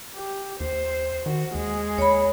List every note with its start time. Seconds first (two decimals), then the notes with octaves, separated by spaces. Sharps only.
0.15 G4
0.60 D#2 C5
1.26 D#3 F#4
1.55 D#2 G#3
1.98 D#2 C#5 B5